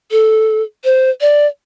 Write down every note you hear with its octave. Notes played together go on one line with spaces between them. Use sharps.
A4
C5
D5